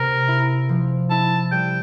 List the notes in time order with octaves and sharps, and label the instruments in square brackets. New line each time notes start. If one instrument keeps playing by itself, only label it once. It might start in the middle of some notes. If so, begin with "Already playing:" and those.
Already playing: [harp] C3 [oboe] A#4
[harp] E4
F3
[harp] E4 [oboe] A5
[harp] G3 [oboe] G5